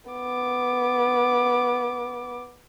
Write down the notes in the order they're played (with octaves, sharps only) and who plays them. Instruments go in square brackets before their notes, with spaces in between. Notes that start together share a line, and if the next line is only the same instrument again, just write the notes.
[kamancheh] B3 D6